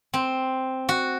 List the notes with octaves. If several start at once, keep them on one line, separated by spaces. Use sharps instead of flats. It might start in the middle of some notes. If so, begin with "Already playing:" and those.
C4
F#4